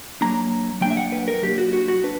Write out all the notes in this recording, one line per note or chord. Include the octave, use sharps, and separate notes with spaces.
F#3 A#3 D4 A#5
F#3 A#3 D4 G5
E5
F#5
B4
A#4
F#3 A#3 D4 G4
F#4
F#4
F#4
D4 B4